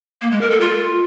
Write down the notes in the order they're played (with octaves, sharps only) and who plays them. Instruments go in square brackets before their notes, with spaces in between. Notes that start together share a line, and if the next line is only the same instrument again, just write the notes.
[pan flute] A#3
G#3
A#4
A4
F4